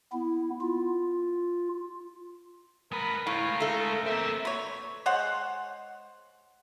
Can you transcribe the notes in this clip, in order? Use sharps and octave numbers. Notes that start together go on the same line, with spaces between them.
B3 E4
F4
G#3 A#4 B4
A2 G#3 A#4 F5
A3 A4
A#3 C4 E5
B4 C#5
G#3 C5 C#5 F#5